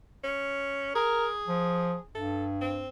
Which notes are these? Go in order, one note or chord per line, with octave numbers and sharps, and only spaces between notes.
C#4
G#4 A#4
F3
G2 A4
C4